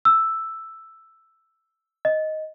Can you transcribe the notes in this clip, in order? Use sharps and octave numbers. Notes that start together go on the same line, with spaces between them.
E6
D#5